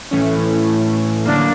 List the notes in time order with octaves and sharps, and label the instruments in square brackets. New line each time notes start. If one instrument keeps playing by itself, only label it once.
[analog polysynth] A2 E3 A3 C#4
[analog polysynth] D3 F#3 A#3 [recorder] D4